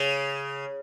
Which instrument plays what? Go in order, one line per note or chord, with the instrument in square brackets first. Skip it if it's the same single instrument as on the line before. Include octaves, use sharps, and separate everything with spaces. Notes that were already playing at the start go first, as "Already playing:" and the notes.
Already playing: [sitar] C#3